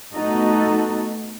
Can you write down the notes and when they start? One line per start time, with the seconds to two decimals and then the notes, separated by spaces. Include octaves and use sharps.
0.14 A3 B3 D#4 F#4 A4